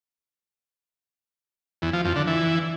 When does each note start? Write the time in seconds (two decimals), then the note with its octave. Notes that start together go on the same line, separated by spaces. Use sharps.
1.82 E2
1.93 F3
2.05 F2
2.16 D3
2.27 E3